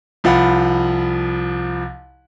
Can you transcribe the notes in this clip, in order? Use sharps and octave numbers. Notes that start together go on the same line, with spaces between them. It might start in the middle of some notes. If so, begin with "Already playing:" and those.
C2 F3 F5 F#5 B5